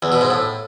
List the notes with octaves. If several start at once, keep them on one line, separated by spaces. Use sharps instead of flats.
E2
B2
G#2
A2